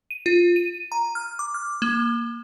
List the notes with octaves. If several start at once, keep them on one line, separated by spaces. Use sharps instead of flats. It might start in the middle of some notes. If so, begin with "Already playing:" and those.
D#7
F4
D#7
A#5
F6
D6
F6
A#3